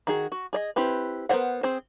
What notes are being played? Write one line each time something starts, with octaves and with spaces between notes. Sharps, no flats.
D#3 F#4 G#4
F#4
G#4 D5 D#5
C4 E4 G4 B4
B3 A#4 C5 C#5 F#5
C4 G#4 C5